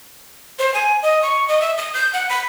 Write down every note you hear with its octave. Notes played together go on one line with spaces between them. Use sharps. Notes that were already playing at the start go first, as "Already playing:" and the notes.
C5
G#5
D#5
C#6
D#5
E5
D#6
G6
F#5
B5